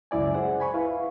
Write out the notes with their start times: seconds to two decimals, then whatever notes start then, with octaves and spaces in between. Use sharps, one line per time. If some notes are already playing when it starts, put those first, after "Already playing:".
0.11 C#2 F#2 E4 D5 G#5
0.34 G#4 C5 F#5
0.60 G#5 B5 C#6
0.74 E4 B4 F5